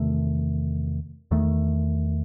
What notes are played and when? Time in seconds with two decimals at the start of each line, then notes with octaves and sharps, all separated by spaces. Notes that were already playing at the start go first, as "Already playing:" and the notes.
Already playing: E2 C3 D#3 A3
1.31 E2 D#3 A3